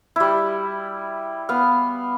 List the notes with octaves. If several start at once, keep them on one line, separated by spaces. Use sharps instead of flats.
G3 E4
B3 F5